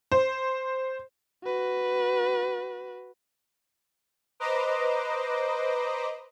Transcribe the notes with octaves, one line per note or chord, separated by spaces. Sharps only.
C5
F#4 B4
B4 C5 D#5 A#5 D6